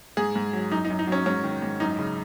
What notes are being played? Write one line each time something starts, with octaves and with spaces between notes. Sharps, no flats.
G#2 G#4
G#2
F#3
F#2 D#4
D#4
F#2
D#4
F#3 C#4
G#2 C#4
D#3
G#2
F#2 D#4
C#3